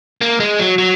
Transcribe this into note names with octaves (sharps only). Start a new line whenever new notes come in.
A#3
G#3
F#3
F#3